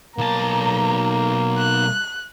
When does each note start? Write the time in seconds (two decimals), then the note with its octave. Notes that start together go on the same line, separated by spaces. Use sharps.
0.18 B1 A#3 A5 A#5
1.58 F#6